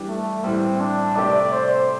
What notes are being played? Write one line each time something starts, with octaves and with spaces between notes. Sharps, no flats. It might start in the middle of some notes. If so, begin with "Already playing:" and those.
Already playing: E3 G3 D4 G4
A3
A2 E3 G3 C4
D4
C3 A3 C4 G4 D5
C5